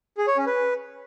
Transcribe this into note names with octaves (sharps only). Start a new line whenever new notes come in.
G#4
C#5
C#4
B4